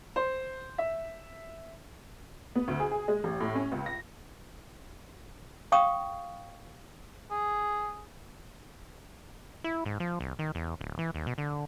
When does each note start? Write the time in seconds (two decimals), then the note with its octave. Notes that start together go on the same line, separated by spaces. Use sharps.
0.16 C5
0.78 E5
2.56 B3
2.68 D2
2.80 G#4
2.91 G#4
3.08 G#3
3.24 A1
3.41 A2
3.55 C#4
3.72 C#2
3.86 A#6
5.72 F5 G5 C#6 D#6
7.31 G#4
9.64 E4
9.86 G#2
10.00 F3
10.21 C2
10.39 D#3
10.55 E2
10.81 D1
10.99 E3
11.15 D#2
11.27 B2
11.38 D3